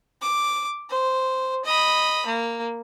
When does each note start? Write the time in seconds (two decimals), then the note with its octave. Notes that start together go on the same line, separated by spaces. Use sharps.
0.22 D6
0.90 C5
1.65 D#5 B5
2.27 A#3